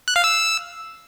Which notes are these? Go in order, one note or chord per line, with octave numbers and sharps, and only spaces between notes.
F#6
F5
E6